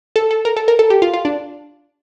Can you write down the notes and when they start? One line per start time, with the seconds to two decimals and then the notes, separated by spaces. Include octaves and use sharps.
0.16 A4
0.31 A4
0.45 A#4
0.57 A4
0.68 A#4
0.79 A4
0.90 G4
1.02 F4
1.14 F4
1.25 D4